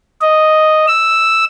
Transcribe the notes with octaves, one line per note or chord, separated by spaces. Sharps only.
D#5
E6